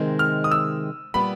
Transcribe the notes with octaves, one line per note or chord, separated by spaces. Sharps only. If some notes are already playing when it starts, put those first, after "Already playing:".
Already playing: C3 D#3 G#3 C4
F6
D#6
E6
A#2 G3 B3 B5